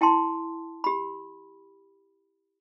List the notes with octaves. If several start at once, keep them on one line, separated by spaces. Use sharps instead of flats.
E4 G5 A5 C6
G4 B5